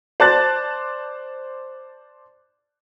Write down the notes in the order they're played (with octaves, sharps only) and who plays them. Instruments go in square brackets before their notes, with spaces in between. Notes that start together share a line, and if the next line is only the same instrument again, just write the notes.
[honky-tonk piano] C5 D5 A5 F#6 A6